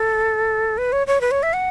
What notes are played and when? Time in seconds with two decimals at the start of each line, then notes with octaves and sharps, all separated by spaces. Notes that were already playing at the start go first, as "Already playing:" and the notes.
Already playing: A4
0.78 B4
0.92 C#5
1.07 C#5
1.21 B4
1.31 C#5
1.43 E5
1.53 F#5